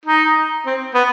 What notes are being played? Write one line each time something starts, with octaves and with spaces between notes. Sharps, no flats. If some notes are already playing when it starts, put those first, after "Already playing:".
D#4
C4
B3